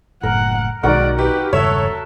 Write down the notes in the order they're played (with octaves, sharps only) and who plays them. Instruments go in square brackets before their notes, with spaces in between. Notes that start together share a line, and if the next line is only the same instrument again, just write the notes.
[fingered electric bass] F#1 A2 [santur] A#4 [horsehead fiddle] F#5
[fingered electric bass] B1 [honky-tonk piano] D#3 [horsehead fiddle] G#3 D5 [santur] F#4 A#4 F#5
[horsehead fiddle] D#4 B4 [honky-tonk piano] G4
[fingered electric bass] E1 G2 C#3 [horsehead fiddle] A4 [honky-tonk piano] C#5 [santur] E5